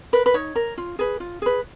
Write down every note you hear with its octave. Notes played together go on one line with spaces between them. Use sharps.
A#4 B4
B4
D#4 C#5
A#4
F4
G#4 B4
F4
G#4 B4